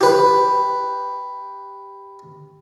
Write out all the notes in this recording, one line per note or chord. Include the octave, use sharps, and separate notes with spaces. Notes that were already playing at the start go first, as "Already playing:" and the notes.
G4 B4